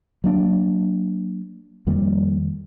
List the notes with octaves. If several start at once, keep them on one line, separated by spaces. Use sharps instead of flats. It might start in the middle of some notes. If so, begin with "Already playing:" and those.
F#3 A#3 D4
F2 D#3 G3 A#3